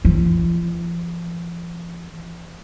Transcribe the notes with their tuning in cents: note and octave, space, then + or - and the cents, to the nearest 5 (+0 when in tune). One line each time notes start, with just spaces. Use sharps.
F3 -40